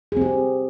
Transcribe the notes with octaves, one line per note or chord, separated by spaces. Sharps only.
C4 G4 G#4